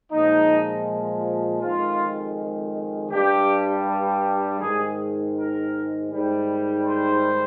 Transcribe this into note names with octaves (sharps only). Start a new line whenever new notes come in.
A#2 F3 G#3 D#4
F2 D#3 G#3 F4
G2 G3 G4
G#2 D#3 G#3 G#4
A#4
G#2 D#3 G3
C5